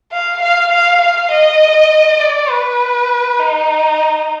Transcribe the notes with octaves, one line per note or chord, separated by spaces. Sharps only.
F5
F5
F5
F5
D#5
D5
B4
D#4